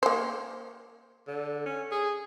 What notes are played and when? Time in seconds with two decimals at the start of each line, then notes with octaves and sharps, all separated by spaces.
0.03 A#3 C5
1.27 D3
1.66 C#4
1.92 G#4